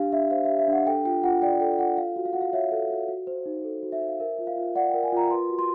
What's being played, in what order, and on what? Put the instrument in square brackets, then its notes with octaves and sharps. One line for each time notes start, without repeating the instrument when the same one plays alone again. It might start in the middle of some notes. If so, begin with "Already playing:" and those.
Already playing: [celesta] D4 G4 F5
D4 E5
C5 F5
E5
G4
E5
D4 F#5
A4 G5
F4 G5
F4 F#5
D5 G5
A4 G5
F4 F#5
A4 F5
F#4
F5
F#4 F#5
F5
C#5 E5
A4
F#4
F#4
C5
D#4
A4
F#4
E5
C5
F5
A#4 E5
F4
F5
F4
D5 F#5
G5
A#4
G#5
F4 A#5
B4 C6
F#4
C6